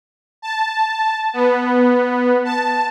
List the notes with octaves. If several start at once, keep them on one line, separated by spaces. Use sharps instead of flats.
A5
B3
A5